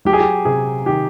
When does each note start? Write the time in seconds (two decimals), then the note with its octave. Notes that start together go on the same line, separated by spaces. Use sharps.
0.05 F#3 G4
0.13 G#4
0.20 G4
0.45 C3 G#4
0.86 D#3 G4